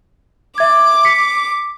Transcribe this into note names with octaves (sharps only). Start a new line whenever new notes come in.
E5 D6 G#6
B6 C#7